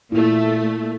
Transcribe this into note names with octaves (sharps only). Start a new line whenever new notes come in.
A#2 A3 E4 F4